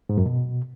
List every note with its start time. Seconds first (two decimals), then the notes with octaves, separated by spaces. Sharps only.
0.09 G#2
0.18 F#2
0.26 B2